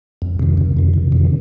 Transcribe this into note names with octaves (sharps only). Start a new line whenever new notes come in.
F2
C3 D#3
F2
C3 D#3
F2
C3 D#3